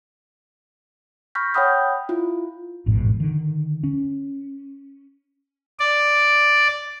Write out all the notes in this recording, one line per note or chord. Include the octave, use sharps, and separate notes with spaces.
B5 C#6 F6 G6 A#6 B6
C#5 F#5 G5 B5 D#6 G6
E4 F4
A1 F2 G#2 B2
D3 D#3
C#4
D5